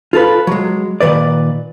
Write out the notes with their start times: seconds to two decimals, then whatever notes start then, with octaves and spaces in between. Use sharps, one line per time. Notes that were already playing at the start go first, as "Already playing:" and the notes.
0.13 F4 A4 B4
0.47 F#3 G#3
1.01 A#2 D#3 B4 D5